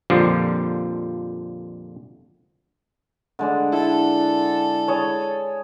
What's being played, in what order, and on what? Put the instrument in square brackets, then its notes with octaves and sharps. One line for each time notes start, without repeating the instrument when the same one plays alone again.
[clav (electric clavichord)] F2 A#2 D3 F3 G3
[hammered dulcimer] D3 G#3 D4
[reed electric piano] E4 [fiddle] A4
[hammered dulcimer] G#4 C#5 A5